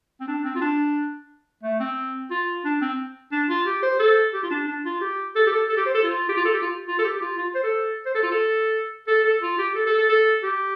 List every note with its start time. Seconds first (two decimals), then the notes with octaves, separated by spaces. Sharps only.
0.20 C4
0.28 D4
0.44 C4
0.55 F4
0.61 D4
1.63 A3
1.80 C4
2.31 F4
2.65 D4
2.81 C4
3.32 D4
3.49 F4
3.66 G4
3.82 C5
3.99 A4
4.33 G4
4.43 F4
4.51 D4
4.67 D4
4.85 F4
5.01 G4
5.35 A4
5.46 G4
5.52 A4
5.69 A4
5.77 G4
5.86 C5
5.94 A4
6.03 F4
6.29 G4
6.36 F4
6.45 A4
6.54 G4
6.62 F4
6.87 F4
6.98 A4
7.04 G4
7.16 G4
7.21 F4
7.38 F4
7.55 C5
7.64 A4
8.06 C5
8.14 A4
8.23 F4
8.31 A4
9.07 A4
9.24 A4
9.42 F4
9.58 G4
9.75 A4
9.86 A4
9.98 A4
10.09 A4
10.43 G4